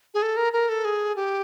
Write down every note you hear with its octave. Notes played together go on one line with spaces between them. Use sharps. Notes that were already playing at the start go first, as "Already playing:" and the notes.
G#4
A4
A#4
A#4
A4
G#4
G4